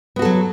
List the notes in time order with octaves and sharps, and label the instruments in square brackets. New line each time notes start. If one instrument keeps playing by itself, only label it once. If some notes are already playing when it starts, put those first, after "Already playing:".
[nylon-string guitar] B3
F#4
A4
F#3